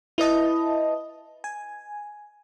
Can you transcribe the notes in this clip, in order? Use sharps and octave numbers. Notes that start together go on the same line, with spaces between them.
E4 B4 D#5 A5
G#5